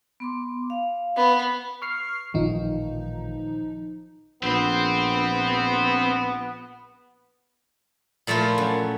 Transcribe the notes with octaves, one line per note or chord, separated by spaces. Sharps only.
B3 C6 D6
F5
B3
C#6 F6 C7
A1 A#2 D#3 F3 D#4
A#1 B3 C4 C5
A#2 F3 A3 E4 F4
F#2